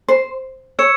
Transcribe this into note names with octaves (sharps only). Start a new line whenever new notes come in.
C5
C#5 C#6 E6 G#6 C#7 E7